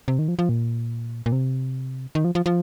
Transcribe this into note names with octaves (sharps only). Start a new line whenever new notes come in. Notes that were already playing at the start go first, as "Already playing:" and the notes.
C3
D#3
F3
F3
A#2
A#2
C3
D#3
F3
F3
F3